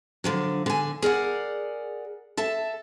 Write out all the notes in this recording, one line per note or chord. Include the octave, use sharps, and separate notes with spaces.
D3 F3 F#3
D3 G#5
G#4 A#4 D5 F#5
A4 E5 A5